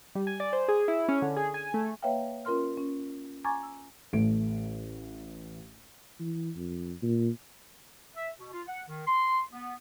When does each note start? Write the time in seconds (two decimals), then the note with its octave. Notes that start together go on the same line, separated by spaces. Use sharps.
0.15 G3
0.27 G#5
0.40 D5
0.53 C5
0.68 G#4
0.88 E4
1.09 C#4
1.22 D3
1.36 G#4
1.54 G#5
1.74 A3
2.02 A#3 B4 C#5 E5 F5 G5
2.45 C#4 F4 A#4 C6 F6
2.77 C#4
3.44 G#5 A#5 C#6 D6 G#6 A6
3.63 E6
4.13 A1 A3 D7
6.20 E3
6.56 F2
7.02 A#2
8.16 E5
8.39 B2
8.53 F4
8.68 F#5
8.88 D#3
9.07 C6
9.52 B3